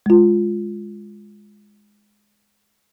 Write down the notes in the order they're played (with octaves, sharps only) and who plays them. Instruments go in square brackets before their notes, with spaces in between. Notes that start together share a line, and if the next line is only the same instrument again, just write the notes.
[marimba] G#3 F4